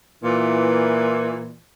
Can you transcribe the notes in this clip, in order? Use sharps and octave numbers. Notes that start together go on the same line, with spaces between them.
A#2 E3